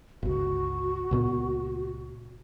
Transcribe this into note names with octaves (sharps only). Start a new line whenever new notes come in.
G1 C#2 F#4
C#2 A#2 B3